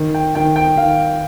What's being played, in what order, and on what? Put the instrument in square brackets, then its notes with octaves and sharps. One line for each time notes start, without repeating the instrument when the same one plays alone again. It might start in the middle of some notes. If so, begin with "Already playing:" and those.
Already playing: [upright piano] D#3
[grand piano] G5
[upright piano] D#3 [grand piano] G5
[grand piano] G5
[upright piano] D#3 [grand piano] F5